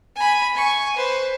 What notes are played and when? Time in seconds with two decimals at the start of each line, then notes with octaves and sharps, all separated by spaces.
0.16 G#5 B5
0.55 G#5 C#6
0.96 B4 C5